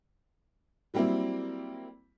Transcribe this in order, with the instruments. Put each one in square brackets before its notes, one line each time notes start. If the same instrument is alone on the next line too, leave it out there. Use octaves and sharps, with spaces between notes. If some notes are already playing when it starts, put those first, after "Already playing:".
[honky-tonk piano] F#3 G3 A#3 C4 E4